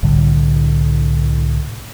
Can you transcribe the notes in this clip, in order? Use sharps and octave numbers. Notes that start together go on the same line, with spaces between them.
C2 A2 D3 G3